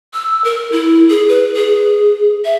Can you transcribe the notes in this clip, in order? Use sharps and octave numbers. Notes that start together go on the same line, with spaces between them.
E6
A#4
E4
G#4
B4
G#4
E5